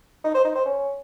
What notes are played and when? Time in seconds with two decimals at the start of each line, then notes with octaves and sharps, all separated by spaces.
0.24 D#4
0.34 C5
0.45 D#4
0.55 C5
0.65 C#4